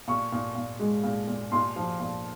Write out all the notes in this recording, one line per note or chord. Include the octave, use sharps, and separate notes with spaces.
A#2 C#6
A#2
A#2
G#3
A#2
A#2
A#2 C6
F3
A#2